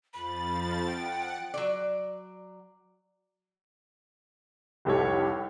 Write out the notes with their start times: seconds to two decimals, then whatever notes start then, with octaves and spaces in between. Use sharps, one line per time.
0.14 F2 F3 B5 A6
0.87 F#5 G5
1.54 F#3 D5
4.85 F1 C2 G4 A4 C#5